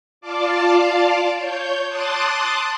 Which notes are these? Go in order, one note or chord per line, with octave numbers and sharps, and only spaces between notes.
F4 D5 F5 A5 D6
C#5 G6
A5 C6 D6 D#6 F#6 A6